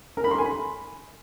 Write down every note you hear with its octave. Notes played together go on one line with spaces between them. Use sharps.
A#4
B5
C6
G#5
B5